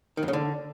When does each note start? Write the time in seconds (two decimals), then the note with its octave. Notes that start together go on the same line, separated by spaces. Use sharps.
0.17 D#3
0.23 F2
0.28 C#3
0.33 D3